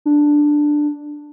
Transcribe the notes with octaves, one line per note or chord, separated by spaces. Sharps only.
D4